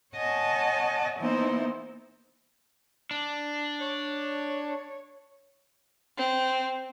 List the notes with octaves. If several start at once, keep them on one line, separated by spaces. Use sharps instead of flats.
C#5 D#5 F#5 G#5 A5
E3 A#3 B3 D#4 E4 C5
D4
C#5
C4